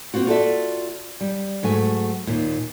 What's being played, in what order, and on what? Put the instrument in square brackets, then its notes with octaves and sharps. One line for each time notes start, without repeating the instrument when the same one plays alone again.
[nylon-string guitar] A#3 C4 F4 F#4
F4 F#4 A4 A#4 D5 E5
G3
G#2 F#3 A3 G#5
D#2 A#2